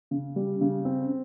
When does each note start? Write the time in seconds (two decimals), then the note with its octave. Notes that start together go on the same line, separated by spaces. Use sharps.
0.11 C#3
0.36 G3
0.61 C#3
0.85 C4